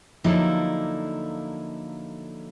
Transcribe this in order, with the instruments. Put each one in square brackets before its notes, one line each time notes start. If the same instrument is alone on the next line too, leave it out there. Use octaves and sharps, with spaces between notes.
[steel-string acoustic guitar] D3 F3 F#3 A#3 D#4 E4